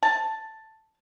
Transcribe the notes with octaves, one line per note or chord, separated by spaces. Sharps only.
A5